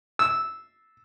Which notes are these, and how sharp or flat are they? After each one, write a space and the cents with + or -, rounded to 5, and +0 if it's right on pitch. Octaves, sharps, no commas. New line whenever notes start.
E6 -10